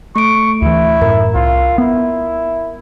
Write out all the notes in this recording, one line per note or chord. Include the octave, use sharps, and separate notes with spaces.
A3 C#6 D7
D2 E3 E4
F#2 A2 A#4
C2 F4
B3 E4